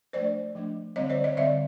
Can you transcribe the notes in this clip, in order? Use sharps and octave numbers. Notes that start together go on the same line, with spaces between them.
F3 A3 D4 C5 D5
F3 A3 D4
D3 G3 C4 C#5 D#5
C5 D5
C#5 D#5
D3 G3 C4 D5 E5